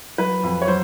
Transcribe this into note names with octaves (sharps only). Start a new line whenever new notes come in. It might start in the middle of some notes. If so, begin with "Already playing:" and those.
F#3 B4
F2
C#5
F#3 C5